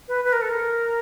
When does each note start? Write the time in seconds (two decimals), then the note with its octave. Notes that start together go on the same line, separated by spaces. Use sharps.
0.08 B4
0.25 B4
0.33 A#4
0.41 A4
0.49 A#4